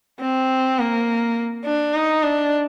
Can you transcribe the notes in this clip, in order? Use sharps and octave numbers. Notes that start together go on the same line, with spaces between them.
C4
A#3
D4
D#4
D4